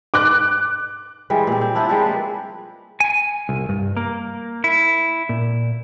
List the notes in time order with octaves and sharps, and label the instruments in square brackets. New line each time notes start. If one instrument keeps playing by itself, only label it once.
[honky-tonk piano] D6 F#6
[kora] E3 G3 G#3
A#2 C4
C4
F3 D4 E4
F3 G3 G#3
A#3 B4
[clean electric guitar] G#5
C2
G2
A#3
E4
A#2